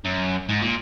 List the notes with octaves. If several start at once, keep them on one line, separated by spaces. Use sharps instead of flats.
F#2
G#2
A#2